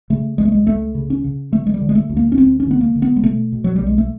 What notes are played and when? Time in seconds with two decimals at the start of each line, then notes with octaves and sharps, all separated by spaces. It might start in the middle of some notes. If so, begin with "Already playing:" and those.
0.10 C#3 A3
0.38 C#2 G#3
0.45 A3
0.52 G#3
0.67 C#2 A3
0.95 C#3
1.10 C#4
1.24 C#3
1.52 D3 A3
1.67 G#3
1.74 G3
1.81 D3
1.89 G#3
1.95 A3
2.09 D2
2.17 A#3
2.32 C#4
2.38 D2 C4
2.60 C#4
2.67 D3 B3
2.81 A#3
2.95 D3
3.02 B3
3.16 G#3
3.23 B2 A3
3.52 B2
3.64 F#3
3.76 G3
3.81 B1
3.86 G#3
3.98 A3